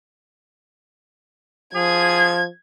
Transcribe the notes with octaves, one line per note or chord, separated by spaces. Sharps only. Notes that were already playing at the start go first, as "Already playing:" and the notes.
F3 G#4 G#6